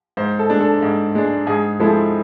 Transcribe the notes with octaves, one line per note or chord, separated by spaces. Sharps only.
G#2 C5
A4
G#3 D4
A4
G#2
G#3 D4
G#2 G#4
F3 G#3 C4 E4 A4